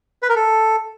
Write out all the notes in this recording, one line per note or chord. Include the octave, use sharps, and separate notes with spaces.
B4
A#4
A4